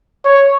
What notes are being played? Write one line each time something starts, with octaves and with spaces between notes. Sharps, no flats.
C#5